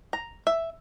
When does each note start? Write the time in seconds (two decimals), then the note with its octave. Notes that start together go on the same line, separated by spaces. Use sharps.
0.13 A#5
0.47 E5